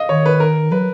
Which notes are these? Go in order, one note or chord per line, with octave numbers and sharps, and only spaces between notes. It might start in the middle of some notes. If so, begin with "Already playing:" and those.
Already playing: D#5 F5
D#3 C#5
B4
A#4
F#3 B4